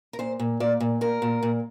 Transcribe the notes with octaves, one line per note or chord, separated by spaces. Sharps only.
A#4
A#2 C5
A#2
A#2 D5
A#2
A#2 A#4
A#2
A#2